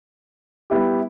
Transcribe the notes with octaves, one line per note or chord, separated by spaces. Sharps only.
G3 B3 E4 G4